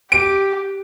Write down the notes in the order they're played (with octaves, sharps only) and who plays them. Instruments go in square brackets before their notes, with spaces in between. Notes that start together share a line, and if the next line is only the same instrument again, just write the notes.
[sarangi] G4 [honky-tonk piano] D7